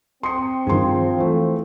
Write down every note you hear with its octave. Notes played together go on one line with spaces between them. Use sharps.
C4 C6 D#6 C#7
G2 D#3 F3 G#4 C6
E3 A3